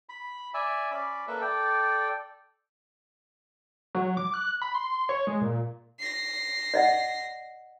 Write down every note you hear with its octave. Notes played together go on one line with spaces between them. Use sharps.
B5
D5 E5 G#5
C#4 D5 B5
A#3 A4 B4 E5
A4 D5 G5
F#3
D6
F#6
B5
C6
C#5
G#3
A#2
A#6 C7
D5 D#5 F#5